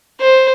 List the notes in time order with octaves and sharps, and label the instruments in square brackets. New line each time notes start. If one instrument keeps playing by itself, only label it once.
[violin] C5